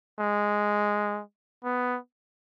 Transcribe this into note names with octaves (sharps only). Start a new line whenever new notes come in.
G#3
B3